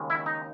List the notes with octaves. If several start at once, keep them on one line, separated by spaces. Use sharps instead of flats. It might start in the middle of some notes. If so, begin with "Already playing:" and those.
Already playing: D#2 C#3 G#3
E4
D#4